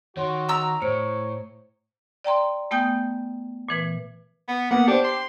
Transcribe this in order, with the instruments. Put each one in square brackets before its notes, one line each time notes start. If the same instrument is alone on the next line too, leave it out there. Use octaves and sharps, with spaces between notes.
[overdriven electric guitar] D#3 [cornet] F#4 [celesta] C#5 C6
[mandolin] A#5 E6
[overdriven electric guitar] A2 [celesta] C5 C#7 D7 [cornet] C#5
[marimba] D5 G5 A#5 C6
A3 B3 G5 G#5 D#6 G6
A#2 E3 B4
[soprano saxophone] B3
[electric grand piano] A#3 B3 [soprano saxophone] F#5
[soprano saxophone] D4 [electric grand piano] G4 C5
[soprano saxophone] C6